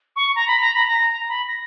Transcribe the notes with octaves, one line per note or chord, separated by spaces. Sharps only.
C#6
A#5
B5
A#5
B5
A#5
A#5
B5
A#6